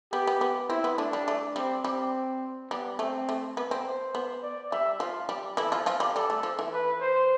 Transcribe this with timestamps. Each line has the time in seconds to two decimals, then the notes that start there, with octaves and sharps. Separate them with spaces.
0.12 B3 G4
0.27 B3
0.41 B3
0.70 C4 E4
0.84 B3
0.98 A3 D4
1.13 G3
1.28 A3
1.56 G3 C4
1.85 G3 C4
2.71 G3 B3
2.99 A3 C4
3.29 A3
3.57 B3
3.71 C4
3.86 C5
4.15 B3
4.43 D5
4.72 G3 E5
5.00 F3 F4
5.29 G3
5.57 E3 E4 A4
5.72 F3 F4
5.86 F3 F4
6.00 G3
6.16 G3 A4
6.30 A3
6.43 F3
6.59 E3
6.72 B4
7.01 C5